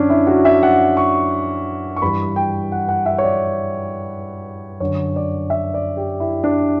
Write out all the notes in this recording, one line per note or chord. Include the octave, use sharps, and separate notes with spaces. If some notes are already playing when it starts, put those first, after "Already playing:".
Already playing: F#2 D3 C#4 D4
E4
F#4
E5
F#5
C#6
C#6
G2 E3 B5
G5
F#5
F#5
E5
C#5
D5
F#2 D3 C#5
D5
E5
D5
G4
E4
D4